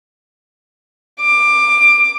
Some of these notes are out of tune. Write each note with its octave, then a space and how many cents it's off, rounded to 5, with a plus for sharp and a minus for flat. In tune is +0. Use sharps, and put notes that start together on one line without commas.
D6 +20